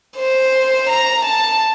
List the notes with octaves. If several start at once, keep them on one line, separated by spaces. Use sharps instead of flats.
C5
A#5
A5